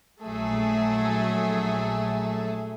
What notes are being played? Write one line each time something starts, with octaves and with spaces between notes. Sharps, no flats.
A#1 F#3 A3 G#4 A4 E5